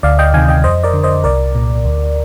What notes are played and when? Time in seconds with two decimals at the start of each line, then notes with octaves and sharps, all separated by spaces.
0.03 D2 D5 F5
0.19 D#5 G5
0.34 C3 D#3 F5 G#5
0.48 D#5 G5
0.64 F2 C5 D#5
0.83 A#4 D5
0.94 D3
1.04 C5 D#5
1.24 C2 A#4 D5
1.55 A#2
1.85 D2